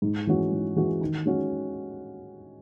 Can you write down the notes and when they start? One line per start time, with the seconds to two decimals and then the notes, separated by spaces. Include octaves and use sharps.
0.02 G#2
0.27 E3 G#3 C#4 F#4
0.51 G#2
0.76 E3 G#3 C#4 F#4
1.01 D#3
1.26 G#3 C#4 F#4